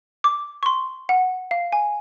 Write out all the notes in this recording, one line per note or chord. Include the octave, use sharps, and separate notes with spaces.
D6
C#6
C6
F#5
F5
G#5